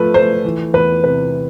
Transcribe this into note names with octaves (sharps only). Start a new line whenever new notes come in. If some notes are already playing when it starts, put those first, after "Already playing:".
Already playing: F3 A3 B4
A3 C5
E3
E2 B4
C3 B4